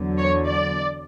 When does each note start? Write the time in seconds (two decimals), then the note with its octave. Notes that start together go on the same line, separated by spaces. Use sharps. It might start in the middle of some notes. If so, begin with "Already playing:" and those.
Already playing: E2 D3 F#3
0.18 C#5
0.47 D5